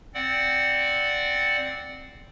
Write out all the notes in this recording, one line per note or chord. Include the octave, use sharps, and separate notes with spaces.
C4 D5 F#5